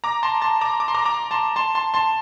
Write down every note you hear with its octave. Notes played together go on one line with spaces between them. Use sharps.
A#5 D6
A5 C6
A5 C6
A#5 D6
D6
C6
A#5 D6
A#5 D6
A5 C6
A5 C6
A5 C6
A5 C6